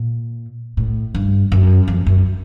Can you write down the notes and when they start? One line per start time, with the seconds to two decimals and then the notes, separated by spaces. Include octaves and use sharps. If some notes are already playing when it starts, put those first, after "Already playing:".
Already playing: A#2
0.77 A2
1.14 G2
1.52 F#2
1.88 F2
2.06 F#2